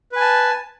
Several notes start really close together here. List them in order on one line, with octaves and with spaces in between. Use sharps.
B4 G#5 A5